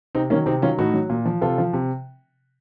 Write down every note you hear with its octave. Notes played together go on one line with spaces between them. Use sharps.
C3 C4 D#4
D#3 F#3 A#3 C#4
C3 C4 D#4
D#3 F#3 C#4 F4
A2 D#4 F#4
F#3
A#2
F3
C3 F4 A4
F3
C3